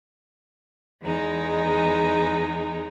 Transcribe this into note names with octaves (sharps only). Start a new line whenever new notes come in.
E2 G#3 D#4